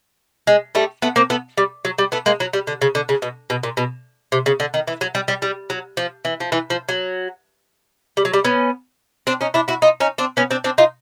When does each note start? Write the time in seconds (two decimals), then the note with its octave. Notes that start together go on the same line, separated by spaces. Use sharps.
0.47 G#3
0.75 G3 A3
1.02 A3 B3
1.16 A#3 C4
1.30 A3 B3
1.58 G3
1.85 F#3
1.98 G3
2.12 A3 B3
2.26 G#3 A#3
2.40 F#3
2.53 G3
2.67 D3
2.82 C#3
2.95 D3
3.09 C#3
3.22 B2
3.50 B2
3.63 A#2
3.77 B2
4.32 C3
4.46 C#3
4.60 D3
4.74 D#3
4.87 E3
5.01 F#3
5.15 G3
5.28 G3
5.42 G3
5.70 F#3
5.97 F3
6.25 E3
6.40 F3
6.52 E3
6.70 F3
6.89 F#3
8.17 G3
8.25 F#3
8.34 G3
8.45 B3 C#4
9.27 C4 D4
9.41 C#4 D#4
9.54 D4 E4
9.68 E4 F#4
9.82 D#4 F4
10.00 C#4 D#4
10.18 C4 D4
10.37 B3 C#4
10.51 C4 D4
10.64 C4 D4
10.78 D#4 F4